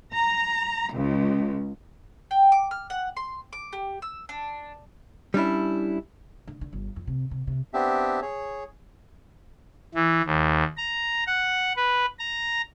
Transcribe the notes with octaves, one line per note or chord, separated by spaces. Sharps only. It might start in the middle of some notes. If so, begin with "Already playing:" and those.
A#5
C#2
G5
D6
F6
F#5
C6
D6
G4
E6
D4
G3 C#4 D4 E4
D3
D3
G1
F2
C3
C3
C3
B3 C4 D4 G4 E5
G#4 C#5
E3
D#2
A#5
F#5
B4
A#5